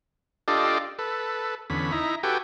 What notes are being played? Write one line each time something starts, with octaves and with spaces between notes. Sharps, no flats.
D4 F4 G4 A4 D5 D#5
A4 B4
E2 D3 C#4 B5
D#4 E4 A#5
F#4 G4 A4 B4 G5 G#5